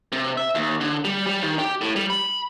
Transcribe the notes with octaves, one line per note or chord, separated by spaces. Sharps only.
C3
E5
D#2
D3
G3
G3
D#3
G4
A2
G3
B5